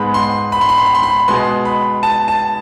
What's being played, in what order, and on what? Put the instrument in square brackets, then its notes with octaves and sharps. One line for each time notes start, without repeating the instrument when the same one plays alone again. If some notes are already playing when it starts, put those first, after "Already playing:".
Already playing: [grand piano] G#2 G#3 B3 B5
C6
B5
C6
B5
C6
B5
C6
B5
B2 G#3 B3 C6
B5
A5
A5